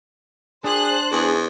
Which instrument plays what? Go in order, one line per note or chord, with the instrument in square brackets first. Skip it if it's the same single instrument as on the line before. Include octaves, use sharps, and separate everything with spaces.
[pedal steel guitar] D4 [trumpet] G#4 [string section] C5 F#6
[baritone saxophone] E2 [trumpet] G#4